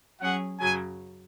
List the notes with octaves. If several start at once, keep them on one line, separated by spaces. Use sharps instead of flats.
F#3 C#4 G#4 F#5
F#2 C#3 F#3 G#5